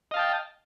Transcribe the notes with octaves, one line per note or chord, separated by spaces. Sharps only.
D#5 F5 G5 A5